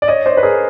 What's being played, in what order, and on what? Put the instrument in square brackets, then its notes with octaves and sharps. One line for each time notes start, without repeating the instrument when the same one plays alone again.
[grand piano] D5
C#5 D#5
C5 D5
B4
G#4 A#4